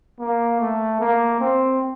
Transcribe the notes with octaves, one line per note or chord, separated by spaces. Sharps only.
A#3
A3
A#3
C4